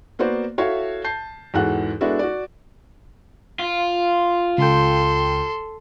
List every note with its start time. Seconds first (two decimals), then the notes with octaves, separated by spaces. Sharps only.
0.19 A#3 B3 F#4 C5 D5
0.58 E4 F#4 A4 C#5 E5 F5
1.04 A5 G6 C7
1.54 E2 G#2 F#4 A4 F#5 F#6
2.01 G#3 B3 D4 E4 F#4 A4
2.19 F#4 D5
3.59 F4
4.58 C#2 A4 G5 C6